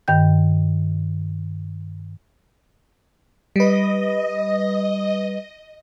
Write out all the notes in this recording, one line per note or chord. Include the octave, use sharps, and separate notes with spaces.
G2 D#3 G5 G6
G3 B4 D#5